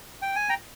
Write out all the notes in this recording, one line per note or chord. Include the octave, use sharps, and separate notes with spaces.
G5
G#5
G5 A#5